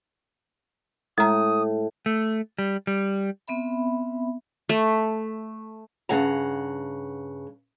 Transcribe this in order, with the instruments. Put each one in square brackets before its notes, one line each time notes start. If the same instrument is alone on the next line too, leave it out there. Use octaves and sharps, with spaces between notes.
[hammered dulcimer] A2 [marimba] G#3 A#5 [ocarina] D#6
[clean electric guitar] A3
G3
G3
[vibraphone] B3 C4 E5 B5
[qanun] A3
[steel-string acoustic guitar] G2 C#3 F#5 A#5